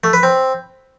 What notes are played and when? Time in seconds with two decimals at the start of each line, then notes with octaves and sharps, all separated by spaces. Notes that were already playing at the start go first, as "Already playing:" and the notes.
0.04 A3
0.13 B4
0.23 C4